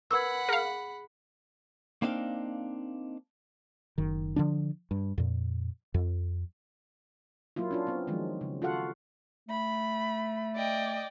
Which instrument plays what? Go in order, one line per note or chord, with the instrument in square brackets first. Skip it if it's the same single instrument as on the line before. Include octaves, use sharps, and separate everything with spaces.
[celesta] A#4 B4 G#6 [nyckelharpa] F#5 B5 [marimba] E6
[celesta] G#4 [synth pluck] A#4 F5
[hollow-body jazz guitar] A#3 C4 D4 D#4 F5
[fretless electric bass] F#1 D#3
D3 F3 D4
G2
F2 A#2
F2
[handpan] F#3 A#3 E4 F4
C#4 D4 F4
B3 C4
D#3 F3 F#3 G#3
C#3
F4 F#4 A4 F5 F#5
[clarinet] A3 [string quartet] B5
[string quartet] D5 D#5 G5